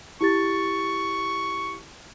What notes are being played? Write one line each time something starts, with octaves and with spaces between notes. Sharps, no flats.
E4 G4 C#6 A6